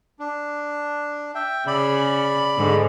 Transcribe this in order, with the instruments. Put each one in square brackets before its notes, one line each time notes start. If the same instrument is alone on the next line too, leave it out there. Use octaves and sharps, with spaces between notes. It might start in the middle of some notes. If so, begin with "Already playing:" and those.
[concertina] D4
E5 G5
[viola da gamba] C#3 [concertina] D5 B5
[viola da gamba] G#2 D3